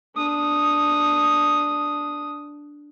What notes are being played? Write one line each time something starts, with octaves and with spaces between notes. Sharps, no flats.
D4 D#6